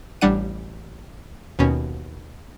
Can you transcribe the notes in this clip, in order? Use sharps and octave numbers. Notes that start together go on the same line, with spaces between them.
A1 G3 D4 F#5 D#7
D#2 B2 C#4